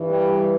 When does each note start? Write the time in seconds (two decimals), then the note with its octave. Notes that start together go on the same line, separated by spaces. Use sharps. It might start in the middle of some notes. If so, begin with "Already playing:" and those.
Already playing: G2 E3
0.10 G3